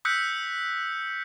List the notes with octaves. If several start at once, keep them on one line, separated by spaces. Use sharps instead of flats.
D#6 E6 F#6 G6 B6 C#7